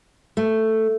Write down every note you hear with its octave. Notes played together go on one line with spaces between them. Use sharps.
A3